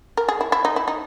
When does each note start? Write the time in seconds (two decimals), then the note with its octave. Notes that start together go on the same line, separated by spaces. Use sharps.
0.17 A#4
0.29 G#4
0.41 E4
0.52 E4
0.65 D#4
0.76 E4
0.88 D#4